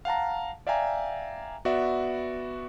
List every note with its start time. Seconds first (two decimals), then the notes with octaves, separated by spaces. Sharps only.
0.05 F5 F#5 A5 A#5
0.67 D5 E5 F5 G5 G#5 A#5
1.65 B3 F#4 D5 E5